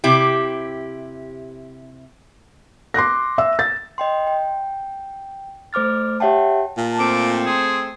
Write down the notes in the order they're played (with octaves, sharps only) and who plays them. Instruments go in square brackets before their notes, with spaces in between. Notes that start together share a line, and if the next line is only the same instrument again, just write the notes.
[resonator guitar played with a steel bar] C3 E4 G4
[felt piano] C6 D6 F#6 A#6
E5 E6
A6
[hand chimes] D#5 G5 C6
G5
A3 C5 D6 F6 A6
G4 C#5 E5 F#5 G5 A5
[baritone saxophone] A#2 [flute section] F4 A5
[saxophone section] A3 C4 [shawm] D6
[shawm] G#4 [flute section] C6